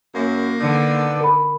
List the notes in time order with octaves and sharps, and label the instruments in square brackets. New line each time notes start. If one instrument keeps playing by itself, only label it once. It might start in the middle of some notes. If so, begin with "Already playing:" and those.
[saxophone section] F#2 [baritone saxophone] A#3
[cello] D3 A4 [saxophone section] D#3 B3 D5
[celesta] A#4 B5